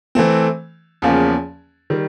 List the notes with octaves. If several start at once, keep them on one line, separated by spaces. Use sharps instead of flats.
E3 A3 C4
E2 C#3 F3 A#3 C#4
D#3 G3